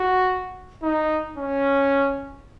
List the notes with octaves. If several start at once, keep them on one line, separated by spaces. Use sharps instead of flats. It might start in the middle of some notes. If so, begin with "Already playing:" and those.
Already playing: F#4
D#4
C#4